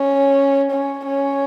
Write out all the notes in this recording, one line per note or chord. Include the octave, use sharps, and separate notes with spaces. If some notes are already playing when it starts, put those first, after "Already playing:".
Already playing: C#4
C#4
C#4